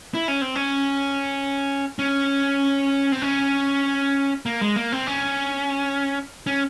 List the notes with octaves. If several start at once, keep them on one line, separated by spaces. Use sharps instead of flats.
E4
C#4
C4
C#4
C#4
C4
C#4
A#3
G#3
A#3
C4
C#4
C#4